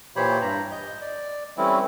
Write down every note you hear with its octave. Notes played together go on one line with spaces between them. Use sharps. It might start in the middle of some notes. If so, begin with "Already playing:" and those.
A#2 E3 G4 C5 C#5 B5
G2 A#5
D#5 G6
D5
E3 G3 A3 C4 C#4 E4